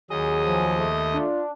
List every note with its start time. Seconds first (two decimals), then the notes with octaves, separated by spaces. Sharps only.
0.10 D#2 F#3 G#4 D#5
0.43 F3
0.79 A3
1.14 D4 F4